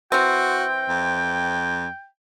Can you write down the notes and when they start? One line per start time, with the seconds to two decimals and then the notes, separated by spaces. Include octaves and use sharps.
0.12 E3 C4 F#4 G5
0.89 F2